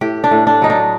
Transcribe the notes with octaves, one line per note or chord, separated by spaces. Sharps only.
A2 G4
D4
A2
D4
F#3 D#4
D4